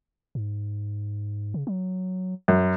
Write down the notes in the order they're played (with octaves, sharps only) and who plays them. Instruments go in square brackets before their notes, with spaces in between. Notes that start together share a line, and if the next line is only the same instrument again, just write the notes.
[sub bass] G#2
C#3
F#3
[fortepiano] F#2